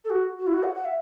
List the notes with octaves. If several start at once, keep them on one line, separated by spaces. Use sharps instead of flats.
A4
F#4
F#4
E4
F#4
F#5
F#5
E5